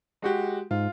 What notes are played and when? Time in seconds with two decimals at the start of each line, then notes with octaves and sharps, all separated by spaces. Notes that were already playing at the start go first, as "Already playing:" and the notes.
0.22 G#3 F#4 G4
0.71 G#2 F4